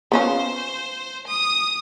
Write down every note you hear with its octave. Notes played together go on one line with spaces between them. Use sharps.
B3 C#4 F4 C5
D#6